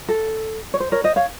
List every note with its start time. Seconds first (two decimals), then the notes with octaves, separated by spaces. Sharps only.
0.09 A4
0.74 C#5
0.80 C5
0.92 A#4 C#5
1.04 C5 D#5
1.16 C#5 F5